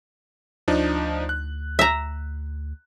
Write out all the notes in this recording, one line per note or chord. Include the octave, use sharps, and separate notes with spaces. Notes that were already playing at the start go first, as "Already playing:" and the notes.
D2 F3 D4 D#4
F#6
E5 A#5